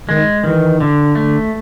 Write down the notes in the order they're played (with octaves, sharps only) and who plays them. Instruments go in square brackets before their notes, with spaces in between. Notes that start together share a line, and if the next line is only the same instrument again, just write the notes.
[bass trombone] D#3 [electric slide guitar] G#3
[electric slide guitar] D#3 [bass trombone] E3
[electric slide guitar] D3
A3